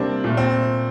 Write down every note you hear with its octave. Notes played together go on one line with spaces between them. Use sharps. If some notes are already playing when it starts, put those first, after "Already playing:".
Already playing: C3 G3 A#3 C4 D4
A#2 A3
C4